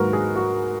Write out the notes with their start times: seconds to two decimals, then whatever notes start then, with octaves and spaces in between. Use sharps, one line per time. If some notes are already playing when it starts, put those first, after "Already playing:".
Already playing: G#2 D#3 F#3 A#3 F#4 A#4 B4
0.13 G#4
0.36 F#4